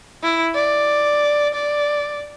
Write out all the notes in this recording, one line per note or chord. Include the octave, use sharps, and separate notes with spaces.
E4
D5
D5